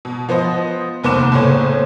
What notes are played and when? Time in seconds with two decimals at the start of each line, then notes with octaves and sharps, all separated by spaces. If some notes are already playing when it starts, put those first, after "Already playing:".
0.05 B2
0.29 F3 B3 C5 D#5
1.04 F1 D#2 B3 C5 D6 E7
1.32 F#1 A2 C5 C#5